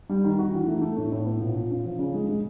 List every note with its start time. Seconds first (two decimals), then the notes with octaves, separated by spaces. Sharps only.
0.09 G3
0.24 D#3
0.39 F#4
0.52 E3
0.67 A3
0.81 A3
0.97 A2
1.12 A2
1.26 B3
1.41 A#2
1.56 A#2
1.70 C#4
1.85 F3
1.99 C#3
2.14 G#3
2.29 G#3